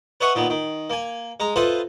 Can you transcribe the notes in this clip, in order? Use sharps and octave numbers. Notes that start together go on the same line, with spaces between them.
B4 C#5 D#5 E5 F#5 C#6
A#2 D#3 B3
D#3
A#3 G#5
G#3 A#5
F4 A4 B4 C5 D#5 E5